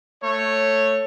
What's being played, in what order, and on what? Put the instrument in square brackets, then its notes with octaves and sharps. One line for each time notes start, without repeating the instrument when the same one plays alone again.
[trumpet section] A3 C#5